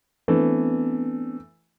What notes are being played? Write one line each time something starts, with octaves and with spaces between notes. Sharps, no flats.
E3 A3 B3 C4 D4